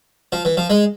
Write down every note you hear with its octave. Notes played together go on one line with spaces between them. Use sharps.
F3
E3
F3
G#3